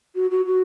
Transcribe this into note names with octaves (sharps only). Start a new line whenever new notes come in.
F#4
F#4
F#4